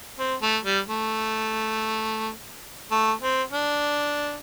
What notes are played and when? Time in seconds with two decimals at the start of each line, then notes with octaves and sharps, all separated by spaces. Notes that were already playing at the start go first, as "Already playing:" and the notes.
0.19 C4
0.42 A3
0.64 G3
0.87 A3
2.91 A3
3.21 C4
3.52 D4